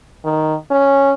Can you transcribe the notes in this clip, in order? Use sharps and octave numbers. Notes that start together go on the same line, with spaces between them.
D#3
C#4